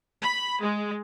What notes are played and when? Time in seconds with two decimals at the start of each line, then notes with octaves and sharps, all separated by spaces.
0.21 B5
0.60 G#3